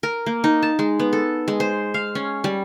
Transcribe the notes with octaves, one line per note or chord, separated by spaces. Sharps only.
A#4
A#3
D#4
A5
G#3
B3
A4
G#3
C5
F5
C#4
G3